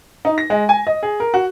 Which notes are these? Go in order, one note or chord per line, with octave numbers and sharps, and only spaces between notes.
D#4
A#6
G#3
G#5
D#5
G#4
A#4
F#4